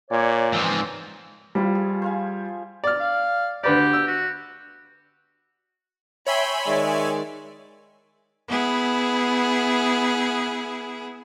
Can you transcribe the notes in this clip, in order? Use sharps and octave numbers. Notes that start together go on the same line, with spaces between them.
A#2 C#5 D5
G#2 E3 F3 C4
F3 G3 E4 F4
G#4
C5 F5 G#5
D5 F6
F5
D2 G4 B4 D5
E6
F#4
C#5 E5 G5 G#5 B5 C6
D#3 G#3 D5
B3 E4 G#4